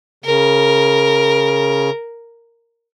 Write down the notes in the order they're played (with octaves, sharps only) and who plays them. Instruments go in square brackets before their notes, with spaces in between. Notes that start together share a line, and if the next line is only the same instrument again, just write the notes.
[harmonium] C#3 [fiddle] A#4